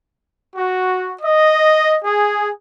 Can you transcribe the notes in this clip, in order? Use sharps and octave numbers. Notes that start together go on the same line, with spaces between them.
F#4
D#5
G#4